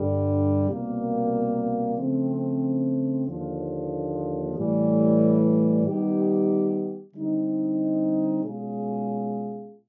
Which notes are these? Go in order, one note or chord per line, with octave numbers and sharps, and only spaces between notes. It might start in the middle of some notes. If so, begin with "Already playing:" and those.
Already playing: G2 D3 G3
C2 B2 G3 A#3
C#3 F3 A3 C4
D#2 D3 F3
A2 E3 G3
D#3 G3 B3 D#4 G4
D3 G3 C4 D#4
B2 G#3 C#4 F4 G#4